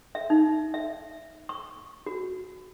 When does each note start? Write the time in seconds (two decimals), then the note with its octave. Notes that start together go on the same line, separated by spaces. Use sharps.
0.15 E5
0.30 D#4
0.74 E5
1.49 C#6
2.06 F#4